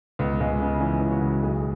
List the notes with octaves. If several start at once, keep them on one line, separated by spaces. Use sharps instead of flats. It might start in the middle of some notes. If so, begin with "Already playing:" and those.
C#2 B3
C#2 G#3
C#3 B3
E4
E3 C#4
C#2
F#4
C#2
B1 G#4